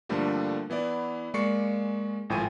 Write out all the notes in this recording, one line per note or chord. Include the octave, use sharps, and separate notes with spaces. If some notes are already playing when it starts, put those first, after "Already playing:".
G2 D3 F3 G3 A3 A#3
E3 B3 E4 D5
G#3 A#3 D5 C#6 C7 C#7
G#1 A2 F3 G5 G#5 D#7